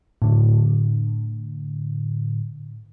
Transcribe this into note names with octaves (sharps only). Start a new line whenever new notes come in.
A2 D3